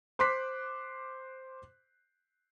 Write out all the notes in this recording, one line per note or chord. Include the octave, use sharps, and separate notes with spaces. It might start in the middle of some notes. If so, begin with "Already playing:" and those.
C5 C6 D6 F#6 B6